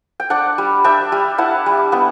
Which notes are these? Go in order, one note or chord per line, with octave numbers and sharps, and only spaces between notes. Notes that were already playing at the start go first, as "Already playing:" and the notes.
G5
D4 D5 F#5
G3
D4 E5 G5
G3
E4 F#5 A5
G3
B3 F#5 A5